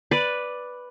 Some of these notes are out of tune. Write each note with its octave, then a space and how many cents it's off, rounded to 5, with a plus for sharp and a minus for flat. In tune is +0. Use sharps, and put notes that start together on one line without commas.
B4 +0 D5 +0